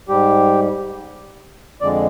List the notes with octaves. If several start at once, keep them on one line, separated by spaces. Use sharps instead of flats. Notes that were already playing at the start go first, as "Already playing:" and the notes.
G#2 G3 G4
F2 D3 G#3 D5